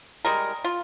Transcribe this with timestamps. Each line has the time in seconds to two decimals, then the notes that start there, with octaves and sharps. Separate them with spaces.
0.25 G3 G#3 A#4
0.64 F4